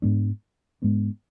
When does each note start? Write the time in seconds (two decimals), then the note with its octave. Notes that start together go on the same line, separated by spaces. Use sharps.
0.02 G#2 G#3 B3 D4
0.82 G#2 G#3 B3 D4